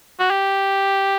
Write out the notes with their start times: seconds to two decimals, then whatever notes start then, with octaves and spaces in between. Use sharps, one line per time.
0.19 F#4
0.30 G4